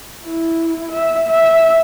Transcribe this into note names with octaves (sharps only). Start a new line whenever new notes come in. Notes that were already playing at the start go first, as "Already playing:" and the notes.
E4
E5
E5